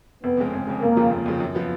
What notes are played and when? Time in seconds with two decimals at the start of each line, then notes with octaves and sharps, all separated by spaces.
0.24 F1 B3
0.38 F2 C#3 G#3
0.53 F1
0.67 F2 C#3 G#3
0.82 F1 A#3
0.97 D#2 C#3 F3
1.11 F1
1.26 D#2 C#3 F3
1.40 F#2
1.55 F3 B3